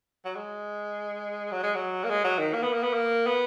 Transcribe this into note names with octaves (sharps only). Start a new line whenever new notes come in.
F#3
G#3
F#3
G#3
F#3
A#3
G#3
F#3
D#3
A#3
B3
A#3
B3
A#3
B3